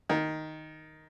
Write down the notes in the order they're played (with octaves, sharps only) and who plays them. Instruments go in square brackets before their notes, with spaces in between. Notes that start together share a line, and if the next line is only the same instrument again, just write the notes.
[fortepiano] D#3